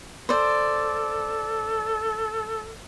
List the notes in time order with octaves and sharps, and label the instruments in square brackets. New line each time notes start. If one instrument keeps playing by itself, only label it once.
[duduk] A4 [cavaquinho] C5 D5